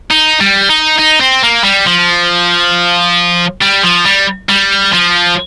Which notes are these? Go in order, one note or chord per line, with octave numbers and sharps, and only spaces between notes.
D#4
G3
D#4
D#4
C4
A#3
G3
F3
G3
F3
G3
G3
F3